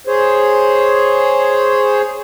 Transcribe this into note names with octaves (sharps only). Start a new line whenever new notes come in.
G#4 C5 C#5